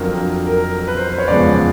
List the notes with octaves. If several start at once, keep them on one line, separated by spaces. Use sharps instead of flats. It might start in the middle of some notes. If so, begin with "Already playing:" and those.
Already playing: F2 D3 F#3 A#4
A#4
B4
C5
C5
C#5
E2 C#3 F3 G#3 D5